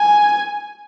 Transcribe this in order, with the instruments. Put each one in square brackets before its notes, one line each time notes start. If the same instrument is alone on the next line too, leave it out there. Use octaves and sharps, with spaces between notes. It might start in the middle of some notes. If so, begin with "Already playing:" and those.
Already playing: [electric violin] G#5